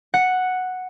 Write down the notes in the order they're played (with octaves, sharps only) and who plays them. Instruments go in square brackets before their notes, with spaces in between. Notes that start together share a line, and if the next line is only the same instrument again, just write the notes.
[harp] F#5